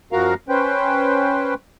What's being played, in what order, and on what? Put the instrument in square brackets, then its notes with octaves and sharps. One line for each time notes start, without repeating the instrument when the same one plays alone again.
[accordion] F#2 F3 F#4 A#4 F5 A#5
C#4 B4 C5 G5